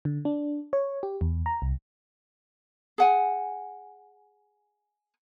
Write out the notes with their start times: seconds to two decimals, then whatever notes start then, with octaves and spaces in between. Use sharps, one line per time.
0.05 D3
0.25 D4
0.73 C#5
1.03 G4
1.21 E2
1.46 A#5
1.62 C2
2.98 G#4 F#5 G#5